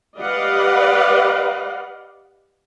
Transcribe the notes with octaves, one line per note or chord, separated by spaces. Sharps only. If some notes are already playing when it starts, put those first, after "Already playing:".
G4 B4 D5 D#5 F5 F#5